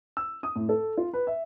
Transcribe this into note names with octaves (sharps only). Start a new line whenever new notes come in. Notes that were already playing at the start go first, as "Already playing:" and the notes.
E6
D#6
A2
A4
F4
B4
E5